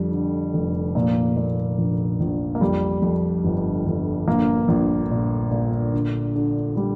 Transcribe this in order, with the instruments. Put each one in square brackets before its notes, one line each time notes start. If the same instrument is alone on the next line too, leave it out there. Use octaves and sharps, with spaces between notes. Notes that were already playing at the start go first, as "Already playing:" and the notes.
Already playing: [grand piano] F2 D3 G3
D3
F1
A#2 A#3
A#2
A#1
A#1
A#3
F2 G3
F2
G1
G1
A#1 A#3
A#1
A#2
A#2
D3
D3
D3 G3